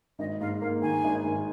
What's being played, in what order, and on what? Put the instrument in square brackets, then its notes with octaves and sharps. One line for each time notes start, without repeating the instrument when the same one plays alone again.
[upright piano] G#1 [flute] D#5
[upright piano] G#2 [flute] F5
[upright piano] A#3 [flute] F5
[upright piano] D#3 [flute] G#5
[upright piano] G#1
G#2